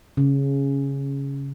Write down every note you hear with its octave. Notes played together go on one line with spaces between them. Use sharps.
C#3